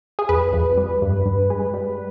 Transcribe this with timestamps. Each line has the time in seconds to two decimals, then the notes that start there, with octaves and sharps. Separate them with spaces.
0.19 G#4
0.29 F2 B4
0.53 F2
0.77 G3
1.02 G2
1.26 G2
1.50 G#3
1.74 G3